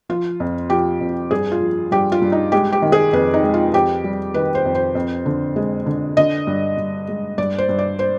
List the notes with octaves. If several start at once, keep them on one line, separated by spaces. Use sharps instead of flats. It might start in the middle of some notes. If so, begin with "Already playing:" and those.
F3 F4
F2
F3 G4
F2
G2 G#4
F4
F3
G2 G4
F4
G2
D#4
G#3 G4
G4
D#3
G#4
F2 B4
D#4
G#3
F4
F2 G4
G3
D#3 B4
C5
F2
C5
F2
D3
G#3
D3
D3 D#5
G2
G2
G#3
G2 D5
C5
G2
D5
C5